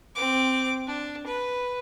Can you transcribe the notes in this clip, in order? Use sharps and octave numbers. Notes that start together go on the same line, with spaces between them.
C4 D6
D4
B4